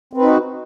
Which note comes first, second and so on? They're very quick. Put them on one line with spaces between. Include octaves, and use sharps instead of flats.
C4 B4 D#4 F#4